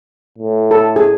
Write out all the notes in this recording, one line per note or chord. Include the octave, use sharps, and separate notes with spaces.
A2
A4
G#4